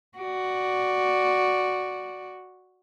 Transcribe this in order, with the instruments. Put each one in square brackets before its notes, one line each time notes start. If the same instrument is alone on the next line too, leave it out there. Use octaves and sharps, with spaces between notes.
[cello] F#4 D5